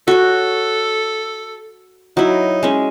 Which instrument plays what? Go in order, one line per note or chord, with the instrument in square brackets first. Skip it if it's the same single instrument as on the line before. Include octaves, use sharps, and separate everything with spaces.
[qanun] F#4 C#5 [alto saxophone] A4
[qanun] F#3 E4 [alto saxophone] D#4
[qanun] G#3 C#4